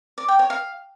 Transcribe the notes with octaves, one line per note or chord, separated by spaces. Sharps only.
D5
G5
C#5
F5